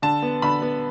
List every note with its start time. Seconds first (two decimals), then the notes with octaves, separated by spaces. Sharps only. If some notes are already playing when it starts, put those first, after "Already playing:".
0.02 D3 A5
0.22 B3
0.42 D3 B5
0.62 B3